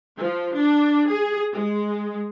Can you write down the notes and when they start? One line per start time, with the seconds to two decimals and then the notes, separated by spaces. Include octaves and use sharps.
0.18 F3
0.56 D4
1.08 G#4
1.53 G#3